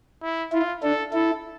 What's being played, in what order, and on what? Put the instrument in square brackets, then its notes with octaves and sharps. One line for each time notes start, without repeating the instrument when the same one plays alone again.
[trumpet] E4
[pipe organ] E4 [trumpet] F4
[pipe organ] D4 [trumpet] A4
[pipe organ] E4 [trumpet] A4